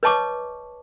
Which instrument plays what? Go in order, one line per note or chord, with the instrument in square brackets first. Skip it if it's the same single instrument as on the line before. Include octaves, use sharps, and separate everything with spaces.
[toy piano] B4 C#5 D#5 A5 C#6 D6